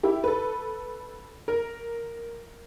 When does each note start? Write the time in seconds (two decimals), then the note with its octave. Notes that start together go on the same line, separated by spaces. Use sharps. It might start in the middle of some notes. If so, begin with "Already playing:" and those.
0.03 E4 G4
0.24 A4 B4
1.48 A#4